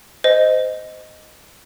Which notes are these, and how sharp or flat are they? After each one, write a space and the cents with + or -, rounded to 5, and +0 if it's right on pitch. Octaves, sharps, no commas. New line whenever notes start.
C5 -20 D#5 +0